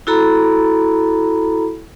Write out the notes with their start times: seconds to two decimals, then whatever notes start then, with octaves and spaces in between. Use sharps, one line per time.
0.07 E4 F#4 A4 A#5 B5